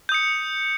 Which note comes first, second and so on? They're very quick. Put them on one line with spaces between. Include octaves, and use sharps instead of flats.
G6 D#6 C#7